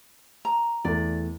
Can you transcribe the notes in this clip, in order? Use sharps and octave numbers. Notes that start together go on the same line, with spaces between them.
A#5
E2 A3 D5